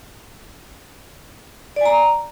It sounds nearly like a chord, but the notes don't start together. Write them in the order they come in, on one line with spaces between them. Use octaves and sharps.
D5 G#5 A#5